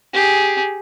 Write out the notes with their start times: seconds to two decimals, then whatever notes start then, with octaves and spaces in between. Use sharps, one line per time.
0.14 G4 G#4